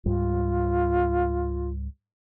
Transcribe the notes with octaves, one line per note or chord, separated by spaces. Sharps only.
C#2 G#2 G3 F4